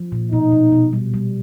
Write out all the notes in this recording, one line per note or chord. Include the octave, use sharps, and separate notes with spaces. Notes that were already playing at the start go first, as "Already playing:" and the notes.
Already playing: F3
A#2
B2 D#4
B2
B2
G3
G3